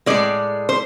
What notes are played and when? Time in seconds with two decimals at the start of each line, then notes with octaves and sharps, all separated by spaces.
0.06 A2 F3 G#3 D5
0.69 C5